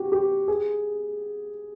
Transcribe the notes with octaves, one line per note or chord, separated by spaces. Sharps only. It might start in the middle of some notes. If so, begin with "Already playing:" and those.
Already playing: F#4 G4
G4
G#4